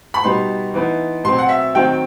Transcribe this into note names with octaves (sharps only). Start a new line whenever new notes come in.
B5
B2 G3 B3 D#4 C6
E3 B3 D#4
B2 F#3 C4 C6
F#5
E5
D#3 F#3 C4 D#4 G5